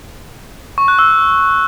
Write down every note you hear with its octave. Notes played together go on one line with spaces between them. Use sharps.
C#6
F#6
E6